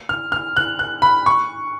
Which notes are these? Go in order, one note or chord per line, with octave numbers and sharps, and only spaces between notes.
F6
F6
F#6
F#6
B5
C#6